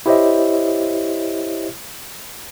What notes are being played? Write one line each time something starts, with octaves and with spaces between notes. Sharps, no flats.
E4 G4 C5 C#5 D#5 E5